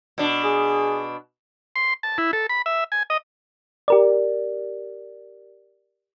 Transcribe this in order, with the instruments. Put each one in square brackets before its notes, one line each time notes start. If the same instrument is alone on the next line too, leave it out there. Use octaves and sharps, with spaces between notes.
[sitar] B2 D4
[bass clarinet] G#4
[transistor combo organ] C6
A5
E4
A4
B5
E5
G#5
D#5
[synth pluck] G4 A#4 D5